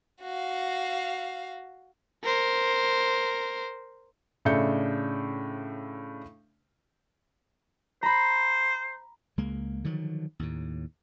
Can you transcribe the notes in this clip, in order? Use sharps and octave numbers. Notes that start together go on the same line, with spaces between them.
F#4 F5
A#4 C5
A2 C#3 D4 E5 G6 C#7
C5 A#5 B5
C#2 G#3 A#3
D3 D#3 F3 F#3
D#2 A2